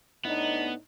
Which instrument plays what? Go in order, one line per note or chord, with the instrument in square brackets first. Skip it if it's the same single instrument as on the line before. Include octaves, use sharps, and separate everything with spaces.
[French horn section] A2 D4 D#4 [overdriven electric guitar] B3